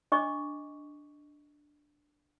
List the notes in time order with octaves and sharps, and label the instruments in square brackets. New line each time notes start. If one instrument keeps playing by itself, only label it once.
[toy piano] D4 D#5 C#6 D6